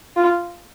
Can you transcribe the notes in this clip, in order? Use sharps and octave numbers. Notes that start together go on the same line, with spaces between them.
F4